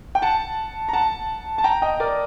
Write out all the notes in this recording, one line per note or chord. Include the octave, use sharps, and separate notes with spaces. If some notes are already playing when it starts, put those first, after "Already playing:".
G5
F#5 A5
A#5
F#5 A5
A5
G5 A#5
D#5 G5
A#4 D5